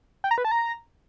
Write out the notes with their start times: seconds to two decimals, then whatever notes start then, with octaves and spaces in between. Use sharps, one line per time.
0.24 G5
0.31 A#5
0.38 B4
0.45 A5
0.51 A#5